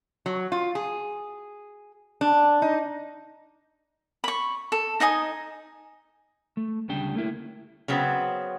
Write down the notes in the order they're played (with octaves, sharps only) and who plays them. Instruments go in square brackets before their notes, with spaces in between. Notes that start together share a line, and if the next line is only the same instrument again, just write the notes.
[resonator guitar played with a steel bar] F#3
F4
G#4
D4
D#4
[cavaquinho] B5 C#6
A4
D#4 D#5 G#5 D#6
[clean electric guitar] A3
D2 C#3 G3 D4 G5
A3 A#3 E4
[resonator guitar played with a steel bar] C#3 F#3 B3 C4